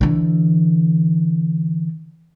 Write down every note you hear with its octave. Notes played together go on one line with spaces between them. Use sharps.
D3 E3